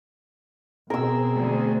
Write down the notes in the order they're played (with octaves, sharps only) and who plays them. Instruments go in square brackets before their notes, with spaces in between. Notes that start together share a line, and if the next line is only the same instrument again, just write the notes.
[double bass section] B2 [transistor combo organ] C4 G#4 [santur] A#4 E6
[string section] D2